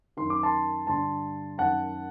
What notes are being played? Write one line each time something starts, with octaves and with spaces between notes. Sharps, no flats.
F#2 D#3 C6
D6
A5 C6
G2 D3 A5 C6
F#2 D#3 F#5 A5